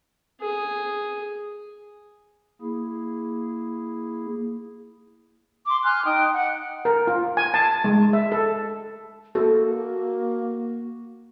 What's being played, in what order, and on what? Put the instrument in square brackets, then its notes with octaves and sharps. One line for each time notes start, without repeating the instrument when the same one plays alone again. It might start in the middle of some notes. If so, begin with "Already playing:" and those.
[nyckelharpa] G#4
[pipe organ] A#3 E4 G#4
[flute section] C6 D6
G#5 C6 F6 F#6
D#4 G5 D#6
F#5
[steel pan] A#4
F4
G#5
A5
G#3
E5
A4
[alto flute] A#3 [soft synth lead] F#4 [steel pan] A4